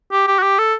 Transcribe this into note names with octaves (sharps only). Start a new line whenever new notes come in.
G4
G4
F#4
G4
A4